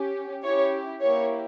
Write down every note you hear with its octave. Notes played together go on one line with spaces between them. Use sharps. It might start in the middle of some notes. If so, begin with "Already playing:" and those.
Already playing: C#4 G4
C#4 E4 G4 C#5
A#3 E4 G4 C#5